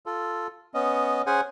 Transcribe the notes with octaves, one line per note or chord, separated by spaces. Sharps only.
F4 A4
B3 C#4 D#5
C#4 G#4 C5 F#5 G#5